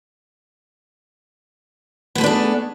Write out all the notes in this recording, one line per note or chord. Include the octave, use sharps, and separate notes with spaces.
A3 B3 D4 G#4 B4